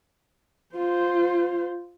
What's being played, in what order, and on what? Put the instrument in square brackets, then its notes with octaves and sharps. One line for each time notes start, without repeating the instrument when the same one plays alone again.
[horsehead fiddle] F4 C5